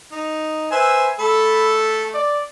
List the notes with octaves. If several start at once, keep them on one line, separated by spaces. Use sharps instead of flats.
D#4
B4 C5 E5 G#5
A3 A4 B5
D5